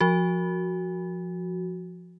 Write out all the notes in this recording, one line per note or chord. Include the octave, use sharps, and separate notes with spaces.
F3 F#4